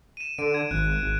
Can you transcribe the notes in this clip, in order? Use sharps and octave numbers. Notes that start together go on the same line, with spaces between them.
D#7 E7
D3 D7
G#6
G#1 F#6
G#1